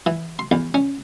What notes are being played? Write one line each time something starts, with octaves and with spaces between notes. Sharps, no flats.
E3
C6
E2
C#4